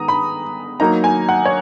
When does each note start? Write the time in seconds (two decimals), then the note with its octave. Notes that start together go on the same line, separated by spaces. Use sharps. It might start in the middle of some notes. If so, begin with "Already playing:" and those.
Already playing: D#3 G#3 B3 A#5 D#6
0.08 B5
0.80 F#3 A#3 D#4 A#5
1.04 G#5
1.29 F#5
1.45 C#5